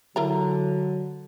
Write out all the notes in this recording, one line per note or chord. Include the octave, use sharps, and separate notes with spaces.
D3 F#3 E4 A#4 A#5